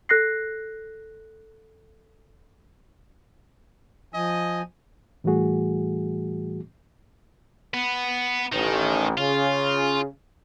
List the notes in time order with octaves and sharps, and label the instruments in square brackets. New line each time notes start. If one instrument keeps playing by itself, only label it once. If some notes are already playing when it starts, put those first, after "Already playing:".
[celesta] A4 F#6 A#6 C7
[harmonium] F3 G#5 [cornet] D#5
[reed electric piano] A2 E3 G3 A3 F#4 G#4
[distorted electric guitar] B3
[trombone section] A1 [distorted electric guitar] D#3
[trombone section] C#3 [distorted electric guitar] F4